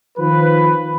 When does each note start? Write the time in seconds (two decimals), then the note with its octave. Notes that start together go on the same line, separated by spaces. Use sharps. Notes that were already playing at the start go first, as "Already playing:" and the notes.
0.18 D#3 F3 B4